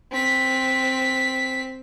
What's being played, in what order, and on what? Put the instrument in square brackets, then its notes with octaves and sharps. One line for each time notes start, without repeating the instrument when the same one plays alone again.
[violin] C4 B6